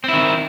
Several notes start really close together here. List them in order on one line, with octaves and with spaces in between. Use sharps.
C4 E4 D#3